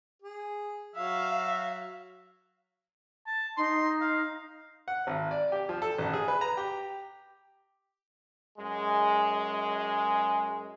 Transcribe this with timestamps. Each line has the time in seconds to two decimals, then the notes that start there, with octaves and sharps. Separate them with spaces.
0.22 G#4
0.95 F#3 F#4 E5 F5
3.26 A5
3.57 D#4 C6
4.01 F5
4.88 F#5
5.07 G#1
5.31 D5
5.52 G4
5.69 F3
5.82 A4
5.98 A1
6.13 G#4
6.28 B4
6.41 A#5
6.57 G4
8.58 F#2 G#3